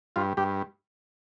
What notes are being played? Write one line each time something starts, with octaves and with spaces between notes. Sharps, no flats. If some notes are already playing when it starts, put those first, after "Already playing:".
G2 F4
G2 G4